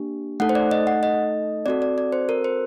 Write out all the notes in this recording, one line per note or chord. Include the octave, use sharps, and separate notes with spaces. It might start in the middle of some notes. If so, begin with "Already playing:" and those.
Already playing: A#3 D4 G4
A3 D#4 A4 F#5
C5
D5
D#5
F#5
D#5
C4 F#4 A4 D5
D5
D5
C5
A#4
C5